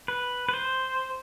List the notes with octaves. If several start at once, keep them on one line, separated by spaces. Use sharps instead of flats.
B4
B4
C5